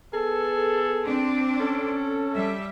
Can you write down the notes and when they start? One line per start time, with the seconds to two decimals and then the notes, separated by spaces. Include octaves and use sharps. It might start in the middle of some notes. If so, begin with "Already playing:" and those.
0.13 B3 G#4 A4
1.05 C4 D4
1.60 C#4 A4
2.34 G3 E5